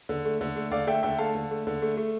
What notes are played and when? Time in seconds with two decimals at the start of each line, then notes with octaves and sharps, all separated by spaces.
0.09 D3
0.25 A3
0.41 D3
0.56 A3
0.71 D3 D5 F5
0.87 A3 E5 G5
1.03 D3 E5 G5
1.19 A3 F5 A5
1.35 D3
1.51 A3
1.67 D3
1.82 A3
1.97 A3